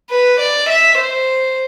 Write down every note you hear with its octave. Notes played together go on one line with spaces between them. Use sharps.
B4
D5
E5
C5